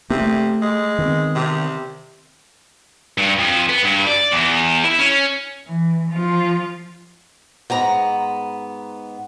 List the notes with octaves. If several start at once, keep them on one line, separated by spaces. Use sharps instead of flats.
C3 A#3
A3
G#3
D#3 B3 C4
C3
G2
F2
B3
G2
D5
E2
E4
C#4
E3
F3 F4
G#2 B3 A#5